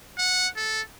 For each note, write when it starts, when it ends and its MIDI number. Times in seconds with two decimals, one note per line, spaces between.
0.18 0.48 78
0.57 0.81 69